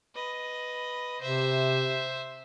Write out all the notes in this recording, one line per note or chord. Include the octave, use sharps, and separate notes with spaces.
B4 D#5
C3 C5 E5